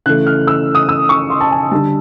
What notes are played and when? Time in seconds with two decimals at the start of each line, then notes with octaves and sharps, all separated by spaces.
0.06 C#3 E3 A3 F#6
0.27 F6
0.47 E6
0.75 D#6
0.89 E6
1.09 C#6
1.30 C6
1.41 A5
1.51 G#5
1.71 D3 G3 A5